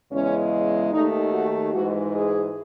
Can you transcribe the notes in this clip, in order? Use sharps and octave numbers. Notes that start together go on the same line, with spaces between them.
E2 C#3 G#3 C#4
D#2 D#3 A3 D#4
F#4
G#2 E3 G#3 F#4
G#4